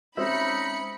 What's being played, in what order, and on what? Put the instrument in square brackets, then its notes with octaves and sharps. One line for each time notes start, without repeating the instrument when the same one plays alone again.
[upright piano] G#3 C4 C#4 [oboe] D#4 [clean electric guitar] E5 [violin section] B5 C#7